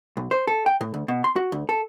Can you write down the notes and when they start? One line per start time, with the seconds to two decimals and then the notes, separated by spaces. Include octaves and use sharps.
0.17 B1
0.31 C5
0.47 A4
0.66 G5
0.81 A2
0.94 D2
1.08 B2
1.24 C6
1.36 F#4
1.52 D2
1.69 A4